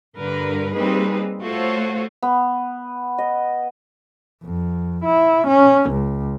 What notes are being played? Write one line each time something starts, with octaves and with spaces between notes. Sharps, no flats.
G2 D3 A#4 B4
G3 A#3 C4 D#4 G#4 B4
A3 F4 F#4 A4 C5 C#5
B3
D#5
F2
E4
C#4
C#2